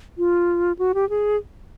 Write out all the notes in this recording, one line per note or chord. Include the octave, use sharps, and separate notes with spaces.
F4
F#4
G4
G#4